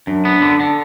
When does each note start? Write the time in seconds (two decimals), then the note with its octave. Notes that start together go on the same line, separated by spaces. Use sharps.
0.07 F#2 D4
0.25 B3
0.42 D3
0.60 D3